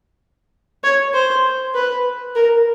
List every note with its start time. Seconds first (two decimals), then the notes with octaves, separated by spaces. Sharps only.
0.84 C#5
1.14 C5
1.75 B4
2.36 A#4